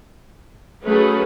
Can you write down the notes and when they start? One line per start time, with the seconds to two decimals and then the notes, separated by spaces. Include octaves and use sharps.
0.85 F#3 A3 C#4 G#4 B4